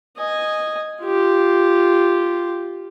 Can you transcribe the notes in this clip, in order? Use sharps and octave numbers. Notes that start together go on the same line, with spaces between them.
D#5 G#5
F4 G4